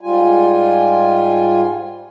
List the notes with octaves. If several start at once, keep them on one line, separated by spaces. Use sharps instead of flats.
G#2 G3 F4 G#5